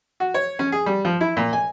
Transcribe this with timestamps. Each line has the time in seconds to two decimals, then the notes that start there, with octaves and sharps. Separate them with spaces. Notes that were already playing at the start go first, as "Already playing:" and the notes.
0.20 F#4
0.34 C#5
0.59 C#4
0.72 G#4
0.86 G3
1.05 F3
1.21 E4
1.37 A#2
1.53 G#5